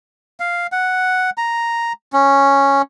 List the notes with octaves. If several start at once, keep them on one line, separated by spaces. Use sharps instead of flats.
F5
F#5
A#5
C#4